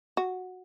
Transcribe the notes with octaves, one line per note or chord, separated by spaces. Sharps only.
F#4